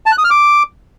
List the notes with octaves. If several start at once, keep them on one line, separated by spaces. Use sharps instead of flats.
A5
F#6
D#6
F6
D6